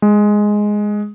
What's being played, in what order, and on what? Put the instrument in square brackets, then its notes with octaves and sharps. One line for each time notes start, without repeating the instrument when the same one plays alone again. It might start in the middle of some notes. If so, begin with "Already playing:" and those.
[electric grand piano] G#3